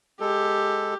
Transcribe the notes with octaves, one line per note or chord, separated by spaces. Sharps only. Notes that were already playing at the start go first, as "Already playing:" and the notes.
G#3 G4 A4